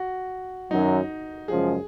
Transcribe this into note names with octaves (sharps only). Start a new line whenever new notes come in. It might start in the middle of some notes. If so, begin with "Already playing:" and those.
Already playing: F#4
F#2 D#3 F#3 D#4
F#2 C#3 F3 G#3 G#4